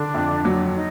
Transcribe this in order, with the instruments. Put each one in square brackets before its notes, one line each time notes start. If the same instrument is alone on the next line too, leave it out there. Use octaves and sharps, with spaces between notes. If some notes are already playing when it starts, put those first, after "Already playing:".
Already playing: [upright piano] D3 [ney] D4
[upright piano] F2
F#3
[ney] D#4